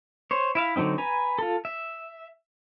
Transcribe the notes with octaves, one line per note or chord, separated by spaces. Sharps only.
C5 C#5
E4 E5 F5
D3 F#3 A3 C4 D#4
B4 G#5 A#5
F4 A4
E5